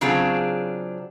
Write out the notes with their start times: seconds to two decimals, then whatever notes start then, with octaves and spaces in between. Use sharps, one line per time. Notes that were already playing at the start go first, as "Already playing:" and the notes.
0.01 C#3 F#3 C4 D4 F4 G#4